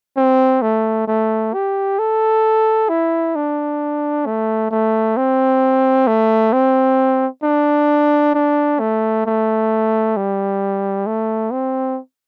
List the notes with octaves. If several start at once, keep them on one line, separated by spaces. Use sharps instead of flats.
C4
A3
A3
G4
A4
E4
D4
A3
A3
C4
A3
C4
D4
D4
A3
A3
G3
A3
C4